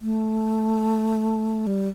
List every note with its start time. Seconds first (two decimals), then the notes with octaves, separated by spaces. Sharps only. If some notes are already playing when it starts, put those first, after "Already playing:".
0.02 A3
1.67 G3